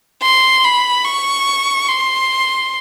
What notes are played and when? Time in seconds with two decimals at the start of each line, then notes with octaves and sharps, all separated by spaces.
0.23 C6
0.65 B5
1.05 C#6
1.89 C6